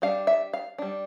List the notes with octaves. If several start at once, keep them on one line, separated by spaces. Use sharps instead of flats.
G3 D4 F5
E5
F5
G3 D4